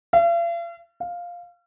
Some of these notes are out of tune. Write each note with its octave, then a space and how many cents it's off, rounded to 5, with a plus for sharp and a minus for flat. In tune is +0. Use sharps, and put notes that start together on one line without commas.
F5 -45
F5 +5